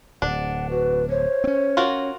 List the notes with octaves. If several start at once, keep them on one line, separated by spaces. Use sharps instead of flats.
D1 D4 F#5
F#4 B4
C5 C#5
C4 C#4
F4 F#4 A#4